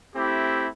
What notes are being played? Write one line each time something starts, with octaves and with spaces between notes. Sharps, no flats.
A3 C4 E4 G4